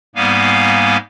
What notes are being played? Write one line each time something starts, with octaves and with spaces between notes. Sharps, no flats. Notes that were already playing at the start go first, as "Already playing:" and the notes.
G#2 G3 A#3 B3 F5 G#5